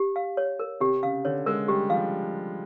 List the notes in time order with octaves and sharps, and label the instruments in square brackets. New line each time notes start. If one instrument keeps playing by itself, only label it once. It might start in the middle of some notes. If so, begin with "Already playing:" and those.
Already playing: [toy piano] G4
F5
C#5
A#4
[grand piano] C3 [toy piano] G4
[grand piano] C#3 [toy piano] F5
[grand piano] D3 [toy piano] C#5
[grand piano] G#3 [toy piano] A#4
[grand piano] G3 [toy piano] G4
[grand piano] F3 [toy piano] F5